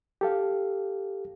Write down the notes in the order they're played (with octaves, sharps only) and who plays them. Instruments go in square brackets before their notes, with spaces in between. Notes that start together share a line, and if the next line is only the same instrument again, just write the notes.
[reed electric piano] G4 A4 F5